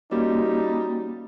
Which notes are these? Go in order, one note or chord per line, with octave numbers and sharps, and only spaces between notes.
G3 A#3 C#4 D#4 F#4